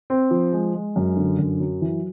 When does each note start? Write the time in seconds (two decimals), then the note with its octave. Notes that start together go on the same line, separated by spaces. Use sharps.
0.10 C4
0.31 F3
0.52 G#3
0.74 G#3
0.96 F#2
1.17 D3
1.39 F#2
1.60 F#3
1.82 E3